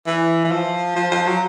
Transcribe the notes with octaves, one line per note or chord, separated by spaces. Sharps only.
E3
E3
F3
F3
F3
F#3